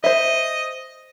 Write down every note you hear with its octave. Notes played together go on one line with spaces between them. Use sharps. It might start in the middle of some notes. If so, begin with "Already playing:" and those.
C5 D#5 E5